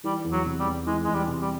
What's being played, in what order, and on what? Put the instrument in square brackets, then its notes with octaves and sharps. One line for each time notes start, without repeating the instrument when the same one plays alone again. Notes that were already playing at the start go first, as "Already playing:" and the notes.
[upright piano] E3 [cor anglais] G3
[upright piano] E2
[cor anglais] F#3
[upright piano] C3
[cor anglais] G3
[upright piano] E2
[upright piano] E3 [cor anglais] G#3
[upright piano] E2 [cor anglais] G#3
[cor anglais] G3
[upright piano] C3
[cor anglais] G3